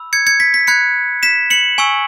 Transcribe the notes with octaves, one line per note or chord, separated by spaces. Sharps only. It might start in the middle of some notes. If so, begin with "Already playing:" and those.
Already playing: B5 E6
G#6 C#7
G#6 C#7
B6
B6
B5 F#6 G#6 C#7
B6 E7
C#7 F#7
G#5 C#6 E6